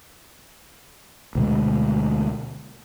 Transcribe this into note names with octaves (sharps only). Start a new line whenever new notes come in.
D2 B2 G#3